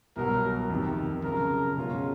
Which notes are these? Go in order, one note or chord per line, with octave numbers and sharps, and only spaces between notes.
C2 B2 F#3 A#4
F2 C3 D#3
F#2 C#3 F3 A#4
B2 G#3 C#4 F4